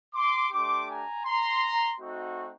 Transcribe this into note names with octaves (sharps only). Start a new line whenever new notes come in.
C6 D6
A3 D4 G4 C6 D6
G#5 A#5
A#5 C6
A3 C4 D#4 F#4